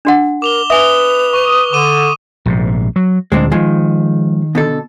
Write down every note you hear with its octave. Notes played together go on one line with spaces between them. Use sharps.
D4 F#4 F#5
A#4 D6 F7 G7
B4 E5 G#5 D#6 F7 G7
C#6 D#6
D3 D6 D#7
A#1 G#2 C3
F#3
D2 A#2 G#3 C4 D4
D#3 F3 G#3
B2 D3 A4